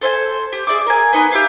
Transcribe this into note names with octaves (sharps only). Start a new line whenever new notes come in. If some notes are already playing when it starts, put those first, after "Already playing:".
A4 C5 F5 G#5
G4
G#4 D5 E5 D6
A#4 G#5
B3 D#4 B4 G#5
G4 E5 F5 G#5